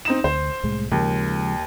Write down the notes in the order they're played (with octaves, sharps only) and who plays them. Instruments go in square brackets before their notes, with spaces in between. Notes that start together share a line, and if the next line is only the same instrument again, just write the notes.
[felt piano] C4 D#4 E7
[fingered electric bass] D2 [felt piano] C5
[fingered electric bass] C2 A2 G#3
[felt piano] D#2 [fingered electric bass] C#3 F3 G#3